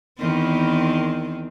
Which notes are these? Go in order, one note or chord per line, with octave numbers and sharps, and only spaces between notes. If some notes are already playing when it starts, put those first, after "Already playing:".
E2 D#3 C4